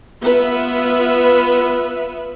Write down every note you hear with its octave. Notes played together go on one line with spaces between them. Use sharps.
B3 F4 B4 E5